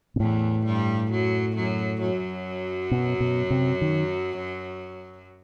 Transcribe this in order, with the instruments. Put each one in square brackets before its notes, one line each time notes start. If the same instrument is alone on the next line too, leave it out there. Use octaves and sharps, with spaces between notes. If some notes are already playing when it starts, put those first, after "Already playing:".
[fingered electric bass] B2
[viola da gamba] E2 E3 [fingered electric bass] A2
[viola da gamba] G2 G3
F#2 F#3
F#2 F#3
F#2 F#3
[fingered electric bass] B2
B2
C3
D#3